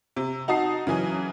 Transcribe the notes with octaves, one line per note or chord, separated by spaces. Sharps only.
C3
D#4 F#4 A5 D#6 C7
C#3 E3 F#3 G#5